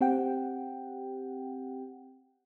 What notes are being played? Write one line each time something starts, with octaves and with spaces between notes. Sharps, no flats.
C4 G4 F#5 G5